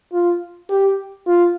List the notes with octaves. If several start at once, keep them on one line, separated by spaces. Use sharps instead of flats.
F4
G4
F4